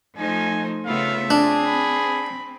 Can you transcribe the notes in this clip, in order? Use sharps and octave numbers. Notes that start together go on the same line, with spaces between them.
F3 A3 D#4 C5 G#5
C#3 A3 B3 F4 E5 F5
C4 D4 G#4
B5